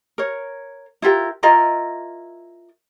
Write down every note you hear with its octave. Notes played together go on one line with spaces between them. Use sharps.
A#4 C#5
E4 F4 G4 A#4
E4 F4 A#4 D#5